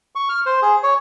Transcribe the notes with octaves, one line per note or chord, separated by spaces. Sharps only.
C#6
F6
C5
G#4
C#5